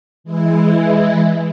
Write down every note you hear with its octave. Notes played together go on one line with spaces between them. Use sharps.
E3 G#3 E4